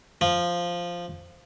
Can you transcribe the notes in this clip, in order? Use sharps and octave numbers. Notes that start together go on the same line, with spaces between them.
F3